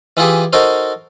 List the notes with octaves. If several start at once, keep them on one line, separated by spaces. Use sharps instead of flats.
E3 E4 F4 G4 G#4
D#4 F#4 A4 A#4 C5